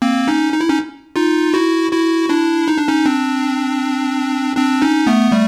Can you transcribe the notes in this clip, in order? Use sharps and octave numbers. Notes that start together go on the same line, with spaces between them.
A#3 C4
C#4 D#4
D#4
E4
C#4 D#4
D#4 F4
E4 F#4
E4 F#4
D4 E4
D#4
D4
C#4 D#4
C4 D4
C4 D4
C#4 D#4
A3 B3
G3 A3